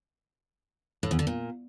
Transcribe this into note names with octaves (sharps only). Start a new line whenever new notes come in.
A2
E2
D3
A#2